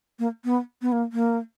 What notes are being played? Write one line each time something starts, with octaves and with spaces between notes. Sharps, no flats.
A#3
B3
B3
A#3
A#3